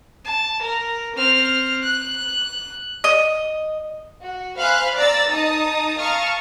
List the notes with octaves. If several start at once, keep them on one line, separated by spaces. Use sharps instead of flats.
A5
A#4
C4 F6
F#6
D#5
F#4
C5 F5 G#5 B5 F6 F#6
D5 A#5 E6 A6
D#4 A5 A#5 D#6
F5 A5 A#5 C#6 D#6 F6